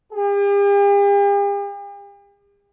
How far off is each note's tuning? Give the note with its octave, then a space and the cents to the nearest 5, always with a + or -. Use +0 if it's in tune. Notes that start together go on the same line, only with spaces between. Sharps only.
G4 +45